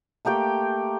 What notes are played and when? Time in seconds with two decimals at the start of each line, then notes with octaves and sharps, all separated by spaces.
0.25 A3 A#3 G4 G5